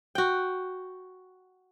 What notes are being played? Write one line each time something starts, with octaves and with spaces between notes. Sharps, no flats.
F#4 G5